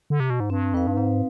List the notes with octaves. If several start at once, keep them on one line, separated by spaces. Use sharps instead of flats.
D3
C3
B2
G#2
G2 C4
F2 D#4 B4 F5
G2
G#2 C4